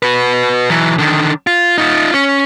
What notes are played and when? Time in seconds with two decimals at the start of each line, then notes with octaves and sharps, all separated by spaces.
0.03 F#4 B4
0.70 E3 F#3
0.98 D3 D#3
1.47 F4
1.78 D#4 F4
2.13 C#4